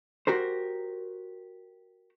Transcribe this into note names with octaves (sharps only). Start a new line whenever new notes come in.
F#4 G4 A#4 C5